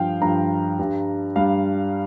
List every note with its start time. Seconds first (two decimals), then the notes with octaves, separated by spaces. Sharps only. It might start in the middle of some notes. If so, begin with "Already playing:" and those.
Already playing: G2 F3 F5 G5
0.21 G2 F3 A#5
0.79 G2 G3
1.36 G2 G3 F5